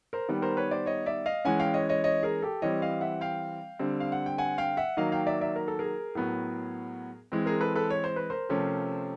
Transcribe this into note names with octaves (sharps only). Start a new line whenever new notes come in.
A#4 C5
D#3 G3 B3
A#4 C5
B4 C#5
C5 D5
C#5 D#5
D5 E5
D#5 F5
E3 G#3 C#4 F#5 G#5
F5 G5
C#5 D#5
C#5 D#5
C#5 D#5
G#4 A#4
G4 A4
E3 G3 C4 C#5 D#5
D#5 F5
E5 F#5
F5 G5
D3 G3 C4
F5
F#5
G5
F#5 G#5
F5 G5
E5 F#5
D#3 F#3 A#3 D#5 F5
F5 G5
D5 E5
D5 E5
A#4
A4
G#4 A#4
A2 F#3 B3
E3 G#3 C4
G#4 A#4
A4 B4
A4 B4
C#5
C5
B4
A#4 C5
C3 F3 A3 C#4